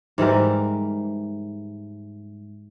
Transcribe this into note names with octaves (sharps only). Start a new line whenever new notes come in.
G#2 E3 G3 A#4